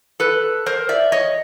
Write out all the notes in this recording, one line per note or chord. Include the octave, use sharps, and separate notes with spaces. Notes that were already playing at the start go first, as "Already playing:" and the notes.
A4 B4
A#4 C5
D5 E5
C#5 D#5